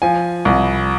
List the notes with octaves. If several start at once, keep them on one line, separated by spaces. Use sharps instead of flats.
F3 G#5
C2